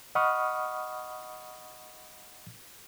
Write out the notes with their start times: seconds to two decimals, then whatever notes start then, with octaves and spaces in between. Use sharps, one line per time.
0.15 D#5 F#5 B5 C#6 D#6 F6